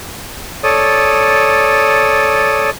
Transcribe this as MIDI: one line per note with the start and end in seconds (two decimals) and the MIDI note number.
0.64 2.70 69
0.64 2.70 73
0.64 2.70 74
0.64 2.70 87